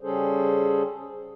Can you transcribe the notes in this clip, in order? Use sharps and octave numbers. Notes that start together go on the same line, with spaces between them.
C#3 G3 C#4 G#4 A4 C5